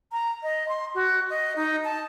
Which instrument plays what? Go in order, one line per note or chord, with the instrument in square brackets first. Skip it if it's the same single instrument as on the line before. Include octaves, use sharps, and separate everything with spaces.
[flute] A#5
D#5
C6
F#4
D#5
D#4
A5